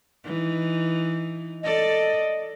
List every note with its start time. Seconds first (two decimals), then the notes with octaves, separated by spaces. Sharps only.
0.24 E3 D#4
1.63 A4 D5 D#5